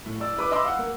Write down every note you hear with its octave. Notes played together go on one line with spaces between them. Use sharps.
A2
D5 E6
E4 B4 D6
D#5 E5 B5 C6 D6 E6
F5 F#5
A#3